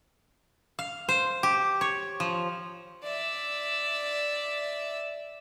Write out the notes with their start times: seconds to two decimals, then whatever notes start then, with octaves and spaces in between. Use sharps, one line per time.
0.79 F5
1.09 C5
1.43 G4
1.81 C#5
2.20 F3
3.03 D5 E5